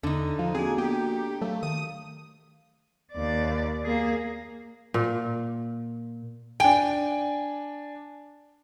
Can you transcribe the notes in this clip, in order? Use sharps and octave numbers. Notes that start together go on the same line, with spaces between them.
E2 D3 D#4
F3 F5
A#3 C4 D4 F#4 G#4
B3 G4
F#3 A3 F5
D#3 D#6
D#2 D5
A#3 G#4
A#2
D4 G5 G#5